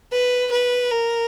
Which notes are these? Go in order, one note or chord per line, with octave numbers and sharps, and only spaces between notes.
B4
B4
A#4